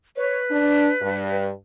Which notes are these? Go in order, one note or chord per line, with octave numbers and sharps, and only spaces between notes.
B4 C#5
D4
G2